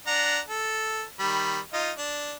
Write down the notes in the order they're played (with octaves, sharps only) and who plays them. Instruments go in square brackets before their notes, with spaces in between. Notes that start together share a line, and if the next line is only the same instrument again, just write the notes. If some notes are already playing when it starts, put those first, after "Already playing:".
[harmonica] D4 F#5 A#5
A4
D#3 G3 B5
D#4 F4 D#5
D4